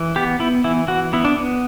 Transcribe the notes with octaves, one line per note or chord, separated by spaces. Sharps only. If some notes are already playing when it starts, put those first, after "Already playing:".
Already playing: E3
B3 G4
B3 E4
E3 E4
E3 F#4
B3 E4
D4
B3